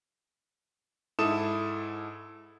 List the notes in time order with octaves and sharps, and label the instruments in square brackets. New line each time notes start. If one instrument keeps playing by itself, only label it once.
[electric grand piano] G#2 E4 A4 D#6 E7